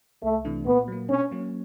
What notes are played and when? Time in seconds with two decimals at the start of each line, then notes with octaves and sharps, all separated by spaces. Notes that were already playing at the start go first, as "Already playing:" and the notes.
0.23 C2 A3
0.45 C3 E3 A3 D4
0.67 A#2 B3
0.88 F#3 A#3
1.10 B2 C#4
1.31 F#3 A#3 C#4